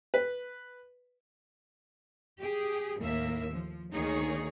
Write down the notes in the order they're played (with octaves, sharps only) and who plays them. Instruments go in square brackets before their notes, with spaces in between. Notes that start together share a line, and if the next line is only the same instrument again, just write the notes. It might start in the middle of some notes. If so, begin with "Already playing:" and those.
[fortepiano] B4
[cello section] G4 G#4
D#2 A2 A#3 E5
F3
D2 D#3 A#3 D#4 G#4 C#5